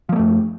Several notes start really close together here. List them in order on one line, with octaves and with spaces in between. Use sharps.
F3 A#3 A3 F#2